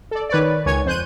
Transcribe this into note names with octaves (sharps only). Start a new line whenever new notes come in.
A4 D5
D#3 B4 C#5 D5
C#2 D#3 C#5 G#5 G#6
F2 C5 F#6 G6 D#7